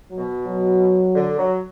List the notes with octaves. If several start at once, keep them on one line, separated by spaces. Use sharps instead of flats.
F#3
B2
F#3
D3
F#3